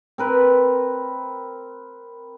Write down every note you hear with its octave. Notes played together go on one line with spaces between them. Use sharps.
C4 A#4 B4